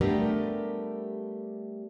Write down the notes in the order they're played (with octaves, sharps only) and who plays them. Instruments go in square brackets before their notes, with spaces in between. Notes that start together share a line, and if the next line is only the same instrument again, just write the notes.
[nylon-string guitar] G3 A3 B3 D4 G4 A#4